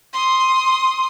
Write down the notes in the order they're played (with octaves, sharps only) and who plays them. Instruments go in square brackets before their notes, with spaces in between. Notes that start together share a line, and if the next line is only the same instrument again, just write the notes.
[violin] C6 D#6